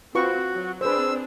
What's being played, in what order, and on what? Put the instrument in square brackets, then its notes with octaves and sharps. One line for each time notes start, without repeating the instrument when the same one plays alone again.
[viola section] C4 [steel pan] F4 B4 C#6 [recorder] F#4
[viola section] F#3
[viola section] C4 D4 G#4 [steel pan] B4 C5 [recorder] E6